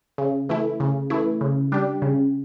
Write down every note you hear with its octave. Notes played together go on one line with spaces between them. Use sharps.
C#3
E3 A3 E4
C#3
E3 A3 E4
C#3
G3 D4 G4
C#3